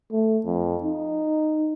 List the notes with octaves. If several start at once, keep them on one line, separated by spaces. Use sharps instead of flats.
A3
F2
D#4